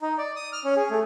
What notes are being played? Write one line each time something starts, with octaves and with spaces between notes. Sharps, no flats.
D#4
D5
D#6
F6
C#4
G#4
A3